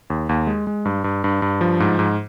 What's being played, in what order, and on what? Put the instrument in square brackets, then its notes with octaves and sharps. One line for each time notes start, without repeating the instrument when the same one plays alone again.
[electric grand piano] D#2
D#2
G#3
G#3
G2
G2
G2
G2
F3
G#2
G#2